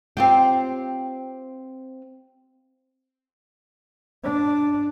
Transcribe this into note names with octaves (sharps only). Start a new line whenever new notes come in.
C4 F4 G4
D4